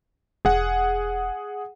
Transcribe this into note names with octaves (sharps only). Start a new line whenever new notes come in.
E1 G#4 F#5